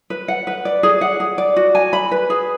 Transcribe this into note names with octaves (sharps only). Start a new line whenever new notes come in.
B4
F#5
B4
D5
G#4
F#5
G#4
D5
F#4
G#5
B5
B4
G#4